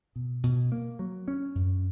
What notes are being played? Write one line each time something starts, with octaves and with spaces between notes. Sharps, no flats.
B2
B2
A#3
F#3
C#4
F#2